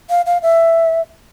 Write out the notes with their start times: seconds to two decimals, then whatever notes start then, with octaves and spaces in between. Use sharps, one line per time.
0.10 F5
0.26 F5
0.43 E5